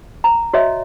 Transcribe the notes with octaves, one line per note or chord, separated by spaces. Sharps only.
A#5
F#4 C#5 D#5 E5